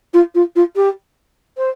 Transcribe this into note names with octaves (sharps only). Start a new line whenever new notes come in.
F4
F4
F4
G4
C5